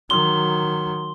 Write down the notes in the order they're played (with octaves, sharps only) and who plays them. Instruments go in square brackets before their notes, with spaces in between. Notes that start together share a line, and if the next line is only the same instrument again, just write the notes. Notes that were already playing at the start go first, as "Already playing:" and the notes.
[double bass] D#3 F#3 [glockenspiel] C6 G7